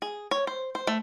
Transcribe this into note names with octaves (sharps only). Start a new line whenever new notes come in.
G#4
C#5
C5
C5
A3